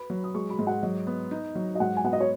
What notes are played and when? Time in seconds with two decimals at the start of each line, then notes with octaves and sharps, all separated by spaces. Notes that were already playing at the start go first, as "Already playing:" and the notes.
Already playing: B4 B5
0.10 F#3
0.24 D#6
0.34 G#3 C#6
0.50 B5
0.59 G#2
0.67 F#5
0.83 F#3 D#5
1.07 B3
1.31 D#4
1.55 F#3
1.75 D#5
1.80 G#2 F#5
1.97 G#5
2.04 B3 F#5
2.13 D#5
2.20 C#5